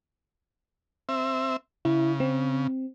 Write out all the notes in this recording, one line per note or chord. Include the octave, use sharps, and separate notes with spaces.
C4 E5
C#3 E4
C4